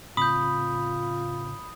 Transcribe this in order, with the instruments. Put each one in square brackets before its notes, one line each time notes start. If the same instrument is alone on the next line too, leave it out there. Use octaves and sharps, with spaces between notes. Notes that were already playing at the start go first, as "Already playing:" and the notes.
[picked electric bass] A2 C#3 C4 [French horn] F4 [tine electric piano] B5 [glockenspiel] D#6 G6